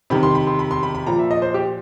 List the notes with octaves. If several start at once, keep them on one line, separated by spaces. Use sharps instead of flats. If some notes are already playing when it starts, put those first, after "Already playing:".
C3 D#3 B5
C6
B5
C6
B5
C6
B5
B5
A#2 F3 A#5
E5
D#5
C5
G4